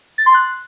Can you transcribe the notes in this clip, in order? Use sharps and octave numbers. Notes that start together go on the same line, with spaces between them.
A6
C6
F#6